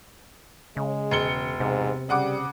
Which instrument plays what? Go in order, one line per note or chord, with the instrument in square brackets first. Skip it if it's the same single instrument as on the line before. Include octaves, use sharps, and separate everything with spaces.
[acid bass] C#3 [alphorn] G#3
[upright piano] E1 C#7 G7
[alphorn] G#2 [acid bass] C3
[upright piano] C#3 F#5 D6 [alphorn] G3